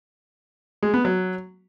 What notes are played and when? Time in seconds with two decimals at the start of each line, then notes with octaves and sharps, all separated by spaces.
0.83 G#3
0.94 B3
1.05 F#3